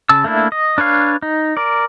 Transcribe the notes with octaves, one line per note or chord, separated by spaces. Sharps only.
C#3 A5 E6
A3 A#3 D4 E4
D#5
D4 B4 C#5 F5
D#4
A#4 D5